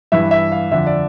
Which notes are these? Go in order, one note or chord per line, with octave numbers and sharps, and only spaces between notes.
G2 E3 E5
E5
F5
F2 D3 E5
D5